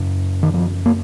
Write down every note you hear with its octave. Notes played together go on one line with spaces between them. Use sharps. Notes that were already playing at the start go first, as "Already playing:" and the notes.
Already playing: F#2 C#3
D#3
F3
A#3